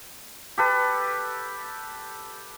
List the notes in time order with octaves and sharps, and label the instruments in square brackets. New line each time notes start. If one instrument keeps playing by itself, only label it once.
[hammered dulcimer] G4 A4 B4